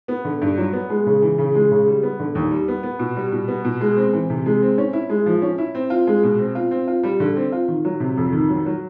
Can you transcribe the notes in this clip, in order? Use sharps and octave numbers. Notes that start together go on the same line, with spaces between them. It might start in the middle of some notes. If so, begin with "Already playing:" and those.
B3
D3
G2
F#3
B3
G#3
C#3
E3
C#3
G#3
C#3
G3
B3
D3
D#2
G3
B3
B3
B2
G3
B2
B3
B2
G#3
C4
E3
C3
G#3
C4
C#4
E4
G#3
F3
C#4
E4
C4
F4
G#3
B2
C4
F4
C4
F4
G3
D3
C4
F4
D#3
F#3
C3
F2
D#3
F#3
F#3